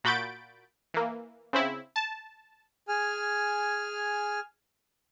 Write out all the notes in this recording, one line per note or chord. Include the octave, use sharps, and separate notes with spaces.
A#2 F#4 B5 G6 A6 D7
E3 A#3
C#3 C4 E4
A5
G#4 G#5 F6